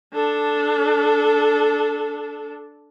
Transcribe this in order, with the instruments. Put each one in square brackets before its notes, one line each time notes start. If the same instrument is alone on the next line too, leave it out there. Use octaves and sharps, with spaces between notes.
[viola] D4 A4